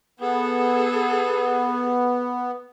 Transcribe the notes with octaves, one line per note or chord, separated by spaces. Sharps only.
B3 G#4 A4